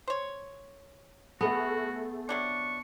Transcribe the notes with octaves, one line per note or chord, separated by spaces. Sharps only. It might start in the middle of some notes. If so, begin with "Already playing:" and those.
C5 C#5
A3 B3 F#4 G#4 A4
C3 F#3 D4 C#6